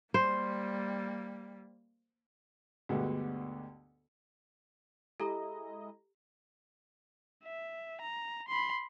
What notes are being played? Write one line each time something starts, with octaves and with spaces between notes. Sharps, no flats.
G3 A#3 C5
D2 G2 B2 D3 G#3 B3
G#3 E4 G4 A4 D#5 A#5
E5
A#5
B5 C6